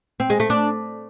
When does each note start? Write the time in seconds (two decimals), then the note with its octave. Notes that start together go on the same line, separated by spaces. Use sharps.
0.20 C4
0.30 G#3
0.40 A3
0.50 D4